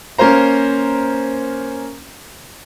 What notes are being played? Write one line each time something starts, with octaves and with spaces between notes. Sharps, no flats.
A#3 C#4 A#4 C5 A#5